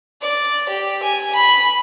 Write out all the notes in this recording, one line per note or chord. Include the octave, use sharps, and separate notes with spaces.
D5
G4
G#5
B5